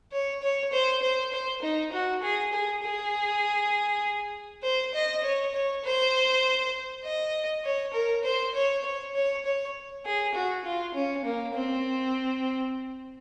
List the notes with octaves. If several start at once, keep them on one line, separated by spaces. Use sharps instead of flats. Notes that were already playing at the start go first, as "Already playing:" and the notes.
C#5
C#5
C5
C5
C5
D#4
F#4
G#4
G#4
G#4
C5
D#5
C#5
C#5
C5
D#5
C#5
A#4
C5
C#5
C#5
C#5
C#5
G#4
F#4
F4
C#4
A#3
C4